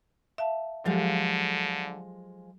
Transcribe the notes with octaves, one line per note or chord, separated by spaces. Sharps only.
E5 F5 A5
D3 F3 F#3 G#3 G4 A4 F5